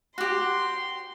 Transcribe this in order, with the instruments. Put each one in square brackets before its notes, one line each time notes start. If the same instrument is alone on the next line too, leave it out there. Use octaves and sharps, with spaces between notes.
[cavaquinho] F#4 G4 [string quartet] C6